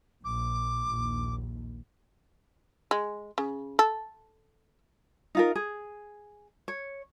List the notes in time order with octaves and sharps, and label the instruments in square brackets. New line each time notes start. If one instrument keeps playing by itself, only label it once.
[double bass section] A#1 [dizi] D6
[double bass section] A#1 D#2
[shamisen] G#3
C#3
A4
[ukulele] D#4 F4 A#4
G#4
C#5